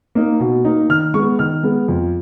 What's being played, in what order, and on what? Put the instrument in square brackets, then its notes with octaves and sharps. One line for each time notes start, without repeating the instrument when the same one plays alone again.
[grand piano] A#3 D#4
B2
A#3 D#4
D#3 F6
G#3 C#6
B3
D#3 F6
G#3 B3
F2